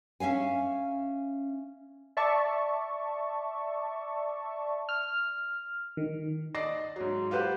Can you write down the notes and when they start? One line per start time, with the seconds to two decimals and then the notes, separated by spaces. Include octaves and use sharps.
0.20 C#4 E5 F5 G#5
2.17 D5 E5 A5 C#6
4.89 F6
5.97 D#3
6.54 D5 D#5 A#6 C7
6.96 G#2 F#3
7.31 F4 G4 B4 C5 F#5